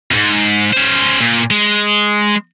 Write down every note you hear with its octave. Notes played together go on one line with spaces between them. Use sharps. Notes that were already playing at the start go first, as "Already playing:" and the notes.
F2 G#2
C#4 C5
A#2
G#3